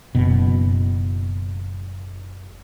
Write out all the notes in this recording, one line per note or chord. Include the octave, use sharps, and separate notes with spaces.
F#1 B2